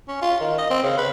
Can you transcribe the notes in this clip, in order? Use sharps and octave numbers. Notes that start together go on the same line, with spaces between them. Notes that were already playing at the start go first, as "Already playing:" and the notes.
C#4
F4
D#3
D#5
C4
C#3
B4